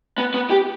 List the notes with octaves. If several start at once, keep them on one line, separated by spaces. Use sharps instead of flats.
B3
B3
G4